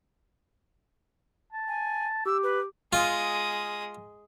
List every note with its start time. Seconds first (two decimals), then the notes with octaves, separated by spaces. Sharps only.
1.53 A5
1.68 G#5
2.26 G4 E6
2.43 B4
2.93 G#3 F4 D#6